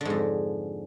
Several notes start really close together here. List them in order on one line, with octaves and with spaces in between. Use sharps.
D3 G#2 F2